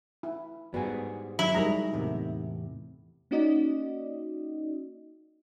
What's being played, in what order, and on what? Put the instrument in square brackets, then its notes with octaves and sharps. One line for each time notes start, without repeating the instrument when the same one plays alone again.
[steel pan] E4
[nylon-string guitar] G#2 G3 [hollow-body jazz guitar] B3 F#4 G#4
[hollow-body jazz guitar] F#3 [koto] E4
[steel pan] G3 G#3 A#5 [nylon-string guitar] D#4 G#4 A#4
[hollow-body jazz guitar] E2 A2 C3
[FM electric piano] A#3 C#4 D#4 F#4 D5 D#5